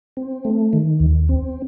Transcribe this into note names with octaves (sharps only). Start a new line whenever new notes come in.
C4
A3
D#3
D#2
C4